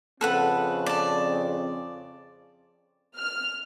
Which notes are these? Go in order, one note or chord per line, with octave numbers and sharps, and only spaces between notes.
F2 C#3 C4 A4 B4 F#5
D5 A5
F6